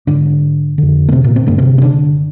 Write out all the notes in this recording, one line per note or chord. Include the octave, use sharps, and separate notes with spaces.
G#2 D3 D4
F2 D3
A#3
C3 C4
A#2 A#3
C4
G2 D3 A#3
C3 C4
C4
D3 D4